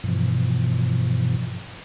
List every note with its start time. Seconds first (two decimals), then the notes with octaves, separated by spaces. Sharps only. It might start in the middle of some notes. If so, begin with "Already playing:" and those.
0.04 G2 B2 E3 F3